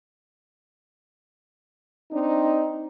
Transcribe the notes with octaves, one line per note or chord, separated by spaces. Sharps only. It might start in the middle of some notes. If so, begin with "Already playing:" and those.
C4 D4 D#4